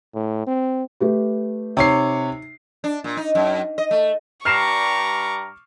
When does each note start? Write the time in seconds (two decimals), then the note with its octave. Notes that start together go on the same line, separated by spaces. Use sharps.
0.14 A2
0.47 C4
1.00 A3 G4 B4
1.77 C3 D#4 C#5 C7
2.84 D4
3.04 A#2
3.17 D#4
3.35 F#2
3.78 D#5
3.91 A3
4.45 G2 G3 A#5 C#6 D6 F6 C7 E7